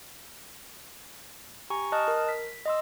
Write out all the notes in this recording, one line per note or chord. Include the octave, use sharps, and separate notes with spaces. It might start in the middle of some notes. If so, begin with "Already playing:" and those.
G4 G#5 A#5 C#6
D#5 A5 D#6 F6 F#6
A#4
B6
D#5 C6 E6